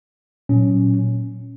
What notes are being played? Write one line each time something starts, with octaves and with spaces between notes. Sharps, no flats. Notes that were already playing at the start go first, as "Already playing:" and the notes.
A#2 F#3 C#4